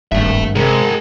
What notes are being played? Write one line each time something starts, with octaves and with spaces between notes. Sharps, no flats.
D#1 G#1 G2 A3 E5
C3 G#3 G#4 A#4